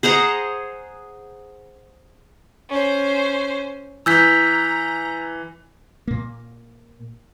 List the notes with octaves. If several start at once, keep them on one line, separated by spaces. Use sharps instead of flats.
G#4 C5 F#5 A#5
C#4 C5
E3 A#5 E6 G6 B6
A#2 A#3